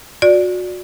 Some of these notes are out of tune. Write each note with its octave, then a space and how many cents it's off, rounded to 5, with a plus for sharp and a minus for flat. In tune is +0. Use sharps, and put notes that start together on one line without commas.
F#4 -30 D5 +0